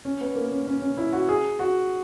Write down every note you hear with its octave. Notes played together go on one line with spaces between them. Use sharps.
C#4
B3
A#3
C#4
C#4
C#4
E4
F#4
G#4
F#4